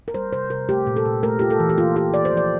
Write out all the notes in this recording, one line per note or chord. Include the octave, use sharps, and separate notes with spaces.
A#4
G3 C5
C3 C5
C3 A#4
A3 G4
A#2
A4
A#2
A3 A#4
F4 G4
A4
E3
G4
A#3 F4
F4 G4
E3 D5
C5
F3
D5